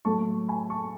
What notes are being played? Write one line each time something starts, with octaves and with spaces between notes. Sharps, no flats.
A2 F#3 A3 A5 C#6
G#5 B5
A5 C#6